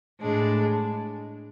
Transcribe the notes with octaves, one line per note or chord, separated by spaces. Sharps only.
A2 G#3 D4